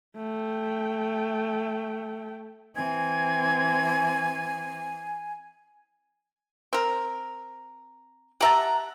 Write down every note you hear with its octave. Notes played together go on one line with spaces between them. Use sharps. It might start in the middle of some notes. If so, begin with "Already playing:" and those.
A3 G5
E3 C4 G#5 G#6
C4 A#4
G4 E5 F#5 A5 A#5